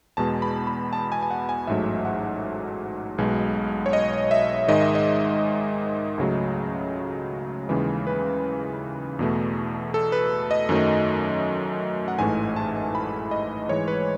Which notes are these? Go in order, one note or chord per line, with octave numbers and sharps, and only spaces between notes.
E2 B2 G#3 A5
B5
B5
A5
G#5
G#5
F#5
G#5
A1 G#2 F#3 A3 E5
F#5
B1 B2 G#3
C#5
D#5
E5
G#2 D#3 G#3 D#5
E5
D#5
C#2 C#3 F#3 A3
D#2 C#3 E3 G#3
B4
E2 B2 A3
A4
B4
D#5
F#2 D#3 F#3 A3
F#5
A1 G#2 E3 A3 G#5
A5
B5
D#5
G#2 E3 G#3 C#5
B4